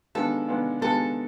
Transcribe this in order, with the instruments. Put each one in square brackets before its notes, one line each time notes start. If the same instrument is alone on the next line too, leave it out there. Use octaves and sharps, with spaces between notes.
[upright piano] D#3 G#3 B3 D4 F4 [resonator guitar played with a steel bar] A4
[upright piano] D#3 G#3 B3 D4 F4
[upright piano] D#3 G#3 B3 D4 F4 [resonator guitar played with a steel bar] A4